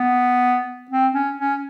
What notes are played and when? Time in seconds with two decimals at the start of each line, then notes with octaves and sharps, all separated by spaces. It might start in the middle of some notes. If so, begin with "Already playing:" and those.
Already playing: B3
0.90 C4
1.14 C#4
1.39 C#4